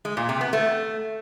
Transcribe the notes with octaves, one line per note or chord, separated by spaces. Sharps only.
G#3
A#2
C3
B3
A3